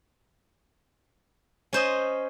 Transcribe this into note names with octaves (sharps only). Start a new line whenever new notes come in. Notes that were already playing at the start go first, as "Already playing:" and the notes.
C#4 C5 D#5